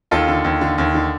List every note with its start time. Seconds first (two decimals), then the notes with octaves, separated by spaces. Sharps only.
0.11 D#2 F4 A4
0.28 D3
0.44 D#2
0.61 D3
0.78 D#2
0.94 D3